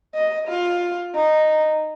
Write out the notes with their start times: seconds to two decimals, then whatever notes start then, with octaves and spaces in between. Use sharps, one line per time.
0.15 D#5
0.48 F4
1.15 D#4